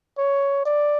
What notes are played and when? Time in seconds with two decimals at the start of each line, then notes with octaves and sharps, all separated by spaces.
0.18 C#5
0.66 D5